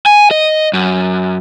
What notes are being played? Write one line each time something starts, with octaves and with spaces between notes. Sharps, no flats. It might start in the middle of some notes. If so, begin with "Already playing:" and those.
G#5
D#5
F#2